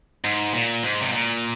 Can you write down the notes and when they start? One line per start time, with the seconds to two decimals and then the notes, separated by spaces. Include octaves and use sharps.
0.24 G#2
0.53 A#2
0.83 G#2
1.02 C3
1.12 A#2